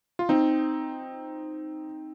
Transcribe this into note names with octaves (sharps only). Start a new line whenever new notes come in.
F4
C4 D#4